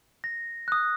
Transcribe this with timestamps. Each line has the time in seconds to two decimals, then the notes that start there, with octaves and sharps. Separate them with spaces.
0.24 A#6
0.68 D#6 F#6